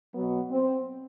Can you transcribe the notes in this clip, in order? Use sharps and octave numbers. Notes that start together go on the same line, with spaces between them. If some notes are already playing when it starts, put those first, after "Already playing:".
B2 F#3 B3
C4